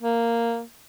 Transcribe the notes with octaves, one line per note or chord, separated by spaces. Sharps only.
A#3